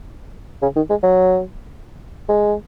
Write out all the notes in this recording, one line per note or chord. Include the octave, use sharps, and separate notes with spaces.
C#3
D#3
G#3
F#3
G#3